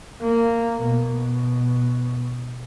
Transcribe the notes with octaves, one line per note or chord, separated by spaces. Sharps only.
A#3
B2